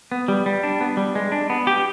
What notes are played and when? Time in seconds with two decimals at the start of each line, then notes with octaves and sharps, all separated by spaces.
0.12 B3
0.28 G3
0.46 G3
0.63 D4
0.81 B3
0.97 G3
1.15 G#3
1.32 D4
1.50 B3
1.67 G4